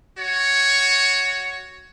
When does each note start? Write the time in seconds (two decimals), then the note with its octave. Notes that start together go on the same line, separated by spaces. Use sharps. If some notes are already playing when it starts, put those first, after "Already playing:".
0.17 F#4 C#5